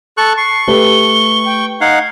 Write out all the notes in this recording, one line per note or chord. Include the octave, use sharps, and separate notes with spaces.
A4 C#6 F#6
C#6 C7
A3 G4 B4 G7
G5
D#4 F5 F#5 G#6